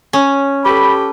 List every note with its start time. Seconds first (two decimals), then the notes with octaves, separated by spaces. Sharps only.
0.13 C#4
0.65 G4 A4 B4 B5